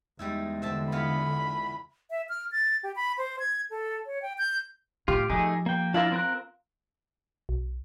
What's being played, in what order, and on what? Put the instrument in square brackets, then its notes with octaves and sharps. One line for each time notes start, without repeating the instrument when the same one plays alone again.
[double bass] E2 G#3 [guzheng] G3 D#4 E4
[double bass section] D3 [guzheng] C4 E5 A5
[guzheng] E3 B3 F4 [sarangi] B5
[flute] E5
F6
A6
G4
B5
C5
G#6
A4
C#5
G5
G6
[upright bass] A2 [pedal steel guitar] F4 [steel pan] G4
[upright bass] F3 [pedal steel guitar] A3 D#4 G#4
[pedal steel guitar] A#3 G5
[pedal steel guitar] D4 E4 A#4 [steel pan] F4
[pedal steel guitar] C4 A#4 F#6
[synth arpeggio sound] B1